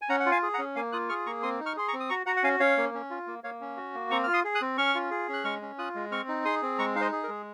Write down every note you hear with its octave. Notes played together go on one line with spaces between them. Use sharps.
G#5
C#4 F#5 A#5
F#5
F4
F5 G#5
G#4
F#5 A#5
C#4
A#3 F5 G#5
F4 D#6 F#6
G#4 C#6 F6
A#3 A#5 C#6
C4 C6 D#6
D#4
C#6 F6
G#4 C6
A#5 C#6
C4
D#6
F#4 A#5 C#6
F#4 F#5 A#5
F#5
C#4 F5 G#5
C#4 C#5 F5
A#3
C#4
F4
A#3
A#3 C#5 F5
C#4
F#4
A#3
C4 A#5 C#6
F4 F6
C6 D#6
G#4
D#6 F#6
C4
C#4 C#6 F6
F4
G#4
C#4
F#6
G#3 C#6 F6
C#4
F4 D#6 F#6
G#3
C4 C#6 F6
D#4
G#4 C6 D#6
C4
G#3 A#5 C#6
D#4 F5
C5 D#5
G#4
A#4
G#3